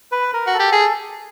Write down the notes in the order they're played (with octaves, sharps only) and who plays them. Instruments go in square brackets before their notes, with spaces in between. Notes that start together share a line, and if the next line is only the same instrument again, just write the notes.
[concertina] B4
A#4
[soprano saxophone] F#4
[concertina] A4
[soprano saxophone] G4
G#4